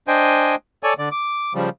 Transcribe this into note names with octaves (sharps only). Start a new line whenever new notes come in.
D4 C5 D#5 G5 G#5
A4 C#5 D5 G#5
D3 D5
D6
C#3 F3 G3